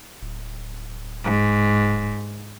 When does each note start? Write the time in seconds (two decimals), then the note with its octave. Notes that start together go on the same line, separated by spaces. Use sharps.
0.21 D1
1.24 G#2